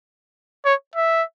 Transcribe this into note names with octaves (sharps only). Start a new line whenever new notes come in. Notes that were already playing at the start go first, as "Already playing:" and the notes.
C#5
E5